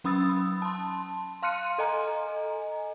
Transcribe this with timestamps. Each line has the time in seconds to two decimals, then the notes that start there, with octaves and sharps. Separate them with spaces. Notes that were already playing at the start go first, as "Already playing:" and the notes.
0.04 F#3 C#4 B5 D#6 E6 A6
0.62 A5 C6
1.42 F5 C6 F6 F#6 C#7 D#7
1.78 A4 D#5 G#5 A#5